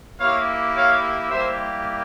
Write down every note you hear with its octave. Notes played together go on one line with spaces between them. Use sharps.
A#3 E4 G4 C#5 F5
C#5 F5
G3 A#3 E4 G4 C5 E5